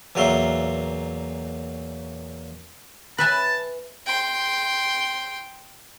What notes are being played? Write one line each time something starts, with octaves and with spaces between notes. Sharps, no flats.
E2 A#2 F#3 A#4 E5 C6
B4 E5 G#5 A5
G5 C6